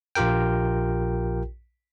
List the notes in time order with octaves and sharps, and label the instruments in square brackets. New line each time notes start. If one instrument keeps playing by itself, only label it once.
[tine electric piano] A#1 F4 G4 A#4 G5